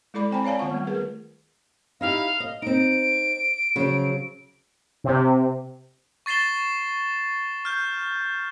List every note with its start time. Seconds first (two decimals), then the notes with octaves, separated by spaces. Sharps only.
0.14 G#3 E4 A4 D5 B5 D6
0.31 C4 C5 G5 G#5 A#5 B5
0.44 C#5 D5 F5 G#5 A5
0.59 D#3 B3 F4 F#5 C#6
0.71 G3 A3
0.87 G#4 A#4 B4
2.01 D#4 E4 G4 F5
2.40 D#5
2.62 C4 D#4 D7
3.76 C#3 F3 F#3
5.04 C3
6.26 C#6 A6 C7 E7 G7
7.65 F6 G6